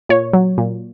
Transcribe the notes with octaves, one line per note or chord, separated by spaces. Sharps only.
A#2 C#5
F#3
A#2